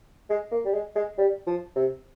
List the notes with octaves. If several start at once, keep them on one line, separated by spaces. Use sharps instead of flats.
G#3
A#3
G3
G#3
G#3
G3
F3
C3